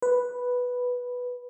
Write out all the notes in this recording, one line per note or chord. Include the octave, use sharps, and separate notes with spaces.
B4